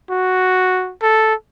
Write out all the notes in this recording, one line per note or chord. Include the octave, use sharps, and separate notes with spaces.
F#4
A4